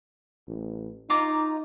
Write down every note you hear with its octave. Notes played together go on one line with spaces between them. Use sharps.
A1
D#4 F4 A#5 D6